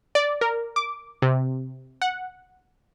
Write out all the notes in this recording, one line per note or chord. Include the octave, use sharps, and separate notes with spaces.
D5
A#4
D6
C3
F#5